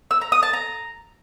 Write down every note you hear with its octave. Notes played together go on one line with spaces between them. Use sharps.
E6
A#5
D#6
A5
A#5